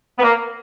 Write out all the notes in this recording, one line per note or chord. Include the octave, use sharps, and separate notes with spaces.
B3
A#3